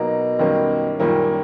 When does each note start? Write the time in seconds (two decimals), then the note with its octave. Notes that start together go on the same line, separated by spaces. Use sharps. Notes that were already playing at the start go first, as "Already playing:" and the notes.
Already playing: B2 F#3 A#3 D#4
0.39 F#2 D#3 G3 A#3 C#4
0.94 A2
1.00 F#2 A#2 D#3 G3 A#3 C#4